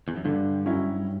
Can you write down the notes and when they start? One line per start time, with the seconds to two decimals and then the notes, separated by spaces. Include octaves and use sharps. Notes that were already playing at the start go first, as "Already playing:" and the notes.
0.08 E2
0.17 F#2
0.25 G2 D3
0.66 F#3 C#4 E4